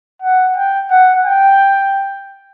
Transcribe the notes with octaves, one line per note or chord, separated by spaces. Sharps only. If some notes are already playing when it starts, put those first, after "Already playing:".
F#5
G5
F#5
G5